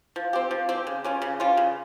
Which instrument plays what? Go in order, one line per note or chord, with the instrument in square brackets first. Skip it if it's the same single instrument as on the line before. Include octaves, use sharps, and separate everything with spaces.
[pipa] F3
C4 G4
F3
C4 G4
C#3
G3 C#4 F4
C#3
G3 C#4 F4
C#3